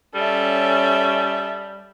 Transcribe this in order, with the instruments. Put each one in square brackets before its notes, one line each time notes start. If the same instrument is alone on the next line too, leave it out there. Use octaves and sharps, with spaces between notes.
[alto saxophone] G3 [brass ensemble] C#4 [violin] A4 E5